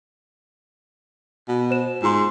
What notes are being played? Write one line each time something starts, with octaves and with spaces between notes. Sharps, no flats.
B2
C5 E7
G#2 F4 C6